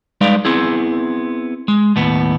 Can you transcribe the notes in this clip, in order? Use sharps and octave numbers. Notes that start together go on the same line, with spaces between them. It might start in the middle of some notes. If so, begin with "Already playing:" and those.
G3 G#3 D#4 B4 D5 F5
B3 C4 E4 G#4
G#3
D#2 A2 B3